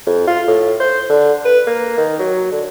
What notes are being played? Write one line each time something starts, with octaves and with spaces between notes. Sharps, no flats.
F2
F4
A2
C5
D3
B4
A#3
D#3
F#3
D3